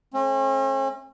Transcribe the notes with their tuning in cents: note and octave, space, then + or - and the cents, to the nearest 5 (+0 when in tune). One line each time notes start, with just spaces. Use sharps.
A3 -30 C#4 -45